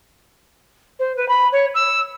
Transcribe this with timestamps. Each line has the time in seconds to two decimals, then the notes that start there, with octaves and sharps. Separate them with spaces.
0.99 C5
1.17 B4
1.29 B5
1.52 C#5
1.75 E6